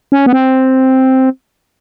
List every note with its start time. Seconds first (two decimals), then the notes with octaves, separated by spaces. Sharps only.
0.12 C#4
0.26 B3
0.33 C4